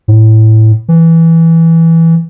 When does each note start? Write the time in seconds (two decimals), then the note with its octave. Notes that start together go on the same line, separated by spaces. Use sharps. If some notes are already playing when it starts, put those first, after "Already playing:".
0.08 A2
0.88 E3